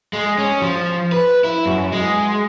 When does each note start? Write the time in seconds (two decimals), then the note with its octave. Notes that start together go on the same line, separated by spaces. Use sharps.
0.13 G#3
0.38 C#4
0.62 F3
1.12 B4
1.44 E4
1.66 F#2
1.92 G#3